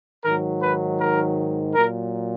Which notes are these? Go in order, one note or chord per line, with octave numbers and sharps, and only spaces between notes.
G#2 D#3 F#3 A#4
B4
A#4
A#2 F#3 A#4